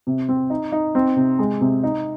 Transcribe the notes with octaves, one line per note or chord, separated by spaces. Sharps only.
C3
C4
D#4
D#4
C4
C3
G#3
C3
D#4